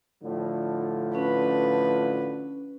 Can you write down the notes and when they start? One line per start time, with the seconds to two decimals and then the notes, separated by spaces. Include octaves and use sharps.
0.24 A2 D3 F3
1.15 C#4 B4